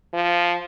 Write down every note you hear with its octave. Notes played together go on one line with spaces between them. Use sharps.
F3